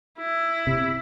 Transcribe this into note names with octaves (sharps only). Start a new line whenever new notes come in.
E4
C3